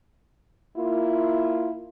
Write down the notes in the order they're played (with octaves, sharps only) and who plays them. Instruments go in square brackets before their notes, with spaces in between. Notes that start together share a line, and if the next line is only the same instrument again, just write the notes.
[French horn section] A#3 E4 F4